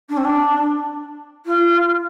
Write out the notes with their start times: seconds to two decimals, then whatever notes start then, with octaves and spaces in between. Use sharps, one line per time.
0.09 D4
0.17 C4
0.24 D4
1.45 F4